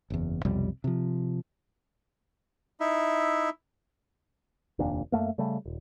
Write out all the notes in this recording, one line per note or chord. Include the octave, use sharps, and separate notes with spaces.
F#1 E2
B1 F2 C3 G3
C3 F3
D#4 E4 E5
F1 D#2 A#2 D4
F#2 A3 A#3
C#3 G3 A3
D#1